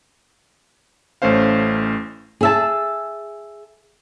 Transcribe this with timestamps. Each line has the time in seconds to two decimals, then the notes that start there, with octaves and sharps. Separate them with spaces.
1.22 A1 A3 C#4 C5 F5
2.41 G#4 E5 A5